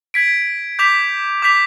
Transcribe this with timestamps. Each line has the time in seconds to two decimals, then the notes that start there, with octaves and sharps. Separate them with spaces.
0.14 G#6 B6 D7
0.79 D6 G6 B6 F7
1.42 D6 G6 B6 F7